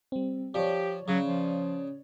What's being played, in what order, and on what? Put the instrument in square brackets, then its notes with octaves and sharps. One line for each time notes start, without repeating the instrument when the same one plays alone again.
[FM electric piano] G3 C4
[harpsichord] F3 [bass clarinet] G4 [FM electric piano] C#5 D5
[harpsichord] C#3 [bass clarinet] F#3
[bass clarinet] F3